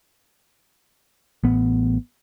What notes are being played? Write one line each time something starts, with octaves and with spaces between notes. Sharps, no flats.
A1 A2 B3